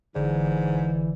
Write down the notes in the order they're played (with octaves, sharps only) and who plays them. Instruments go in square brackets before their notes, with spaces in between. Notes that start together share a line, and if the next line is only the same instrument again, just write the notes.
[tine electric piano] G1 D3 D5 [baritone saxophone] G#2 [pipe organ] E3